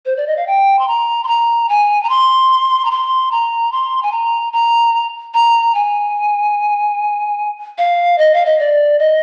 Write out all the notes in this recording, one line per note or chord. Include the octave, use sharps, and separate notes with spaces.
C5
D5
D#5
F5
G5
C6
A#5
C6
A#5
G#5
A#5
C6
A#5
C6
A#5
C6
G#5
A#5
A#5
A#5
G#5
F5
D#5
F5
D#5
D5
D#5